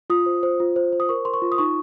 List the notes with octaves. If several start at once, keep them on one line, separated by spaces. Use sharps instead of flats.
F4 D#6
C5
C5
F4
C5
C5
D#6
A#4 C#6
A#4 C6
C#6
F4
D#6
D#4 C#6